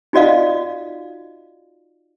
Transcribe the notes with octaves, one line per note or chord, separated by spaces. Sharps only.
D#4 F4 F#4 D5 D#5 F5